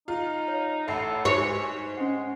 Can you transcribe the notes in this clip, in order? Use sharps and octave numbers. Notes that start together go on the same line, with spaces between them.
D#4 F4
C#5
A1 A4 E5 F#5 B5 C7
G#2 F#4 G#4 C5 C#5 E5
C5 G#5
G#3 C#4 F#5